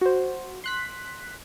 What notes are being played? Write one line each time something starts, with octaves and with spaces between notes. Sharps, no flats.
F#4 C5
C6 F#6 B6